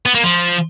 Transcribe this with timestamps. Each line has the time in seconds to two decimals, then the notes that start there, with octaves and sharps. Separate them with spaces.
0.06 B3
0.15 A#3
0.24 F3